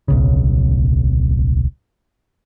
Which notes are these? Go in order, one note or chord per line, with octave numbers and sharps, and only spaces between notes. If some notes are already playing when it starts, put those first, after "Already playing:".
D1 B1 C#3